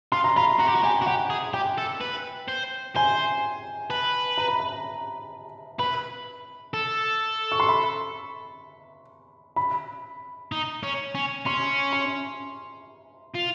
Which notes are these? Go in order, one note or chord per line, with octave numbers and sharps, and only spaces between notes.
F4 C6
A#5
F4 B5
F#4 A#5
G4
F#4
G4 G#5
F#4
G4 F#5
G#4
G4 G5
A4
B4
C5
C5 G#5
B4 A5
A#5
B5
A#5
B4 B5
A4
C#6
C6
B5
B5
D#4
C#4
C#4
C#4 C6
C6
F4